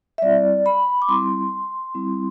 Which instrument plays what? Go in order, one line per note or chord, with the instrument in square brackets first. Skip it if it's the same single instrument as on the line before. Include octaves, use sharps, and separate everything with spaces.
[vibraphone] E5
G3 C4 E4 D5
B5
D6
G3 C4 E4 C6
G3 C4 E4